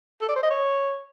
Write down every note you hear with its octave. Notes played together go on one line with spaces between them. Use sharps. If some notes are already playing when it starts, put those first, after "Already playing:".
A4
D5
C5
D#5
C#5